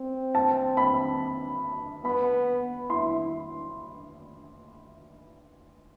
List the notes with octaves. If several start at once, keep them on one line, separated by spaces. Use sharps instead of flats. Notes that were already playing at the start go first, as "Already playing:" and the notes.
Already playing: C4
A5
B5
B3 B5
E4 C6